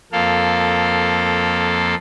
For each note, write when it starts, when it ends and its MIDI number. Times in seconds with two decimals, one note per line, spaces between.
0.12 1.95 41
0.12 1.95 58
0.12 1.95 69
0.12 1.95 77